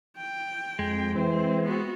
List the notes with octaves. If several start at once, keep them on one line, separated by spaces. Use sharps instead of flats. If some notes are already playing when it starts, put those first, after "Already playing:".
G5
F2 G#3
E3 C4 C5
B3 F#4